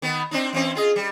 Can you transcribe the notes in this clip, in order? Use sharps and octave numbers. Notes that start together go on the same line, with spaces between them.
D#3 B3
C4 D4 D#4
E3 C4 C#4
F4 G#4 D#5
G3